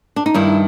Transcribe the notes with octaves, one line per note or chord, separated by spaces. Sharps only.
D4
D#4
G2 D#3 G3 E4